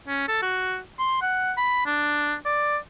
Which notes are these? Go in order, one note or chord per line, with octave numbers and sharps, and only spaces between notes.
C#4
A4
F#4
C6
F#5
B5
D4
D5